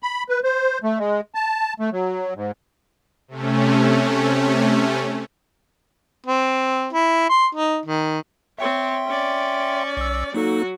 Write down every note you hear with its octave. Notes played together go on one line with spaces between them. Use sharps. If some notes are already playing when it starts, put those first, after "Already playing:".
B5
B4
C5
A3
G#3
A5
A3
F#3
G#2
C3 A3 C#4
C4
E4
C6
D#4
D#3
C4 C#5 E5 G5 C6
C#4 D5
B1 E6
F#3 A#3 D#4 F#4 A4